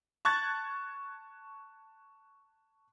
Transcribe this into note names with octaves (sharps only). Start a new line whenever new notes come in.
A5 C#6 F#6 G#6 A6